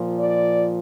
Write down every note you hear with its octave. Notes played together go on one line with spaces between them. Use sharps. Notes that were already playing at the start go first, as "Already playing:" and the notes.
Already playing: A#2 F3
D5